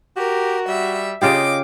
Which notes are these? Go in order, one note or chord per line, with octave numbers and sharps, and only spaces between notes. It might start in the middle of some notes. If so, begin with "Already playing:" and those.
F#4 G4 A#4
G3 E5
C#3 F4 G4 D#5 D6